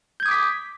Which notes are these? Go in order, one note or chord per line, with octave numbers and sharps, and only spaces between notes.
D6 D#6 G6 G#6 B6